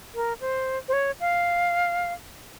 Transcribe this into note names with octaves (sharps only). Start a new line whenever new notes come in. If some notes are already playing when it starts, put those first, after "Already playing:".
A#4
C5
C5
C#5
F5